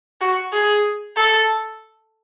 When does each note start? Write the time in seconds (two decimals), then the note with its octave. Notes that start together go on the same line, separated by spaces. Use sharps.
0.21 F#4
0.53 G#4
1.17 A4